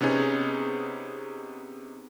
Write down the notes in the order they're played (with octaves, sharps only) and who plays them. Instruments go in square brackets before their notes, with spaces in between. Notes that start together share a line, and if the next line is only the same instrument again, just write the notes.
[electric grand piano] C3 B3 C#4 D#4 G#4